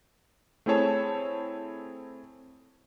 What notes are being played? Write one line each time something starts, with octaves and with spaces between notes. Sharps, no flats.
A3 C4 E4 G#4 C#5 A5